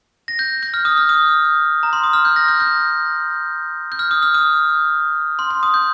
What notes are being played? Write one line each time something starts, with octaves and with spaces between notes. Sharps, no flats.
A#6
G6
G6
F6
D#6
F6
D#6
A#5
C6
D#6
F6
G6
A#6
G6
G6
G6
F6
D#6
F6
D#6
C6
C6
D#6
G6